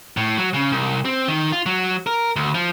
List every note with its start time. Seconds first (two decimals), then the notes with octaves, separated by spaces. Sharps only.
0.17 A2
0.38 F#3
0.54 C#3
0.72 C2
1.05 C4
1.28 D#3
1.52 F4
1.66 F#3
2.07 A#4
2.36 D2
2.54 F3